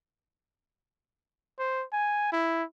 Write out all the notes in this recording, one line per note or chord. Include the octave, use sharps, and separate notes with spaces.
C5
G#5
E4